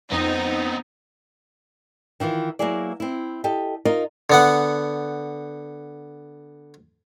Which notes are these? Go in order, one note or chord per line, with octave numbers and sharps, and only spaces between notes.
F2 B3 C4 D#4 D#5
D#3 E3 E4 F4
F#3 A#3 B3 E4 G#4 D5
C4 E4
G4 A4 D#5
D#4 F4 A#4 D#5
D3 B3 F#5